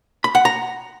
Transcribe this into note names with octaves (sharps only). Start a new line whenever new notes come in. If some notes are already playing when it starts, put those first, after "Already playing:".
B5
F#5
A#5